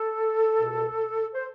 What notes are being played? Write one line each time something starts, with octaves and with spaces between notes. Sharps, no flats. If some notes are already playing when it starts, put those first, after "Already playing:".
Already playing: A4
C#2 B2
C5